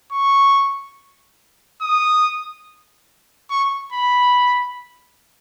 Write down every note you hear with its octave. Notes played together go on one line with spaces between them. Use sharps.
C#6
D#6
C#6
B5